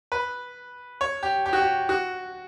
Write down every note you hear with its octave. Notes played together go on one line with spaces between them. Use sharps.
B4
C#5
G4
G4
F#4
G4
F#4